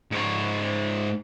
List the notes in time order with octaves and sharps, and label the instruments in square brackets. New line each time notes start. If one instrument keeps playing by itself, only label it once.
[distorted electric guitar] G#2 C#5